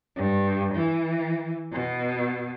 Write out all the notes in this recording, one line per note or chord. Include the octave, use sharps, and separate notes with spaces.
G2
E3
B2